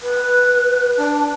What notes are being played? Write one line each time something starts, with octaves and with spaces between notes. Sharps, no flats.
B4
D4